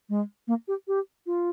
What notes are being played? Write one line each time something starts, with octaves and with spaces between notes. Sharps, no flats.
G#3
A#3
G4
G4
F4